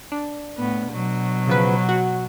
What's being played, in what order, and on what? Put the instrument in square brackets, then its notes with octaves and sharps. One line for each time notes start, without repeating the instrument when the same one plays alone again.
[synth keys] D4
[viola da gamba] A2 B3
B2 F#3
[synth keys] C#3 F3 B4
F#4